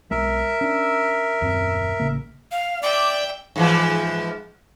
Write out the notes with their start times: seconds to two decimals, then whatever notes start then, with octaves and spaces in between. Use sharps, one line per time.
0.11 B1 G#3 A#4 E5
0.61 C#4 D4
1.42 D#1 F#2 C4
2.00 A1 C#3 A#3
2.51 F5
2.82 D5 E5 G5 D6
3.56 G#2 E3 F3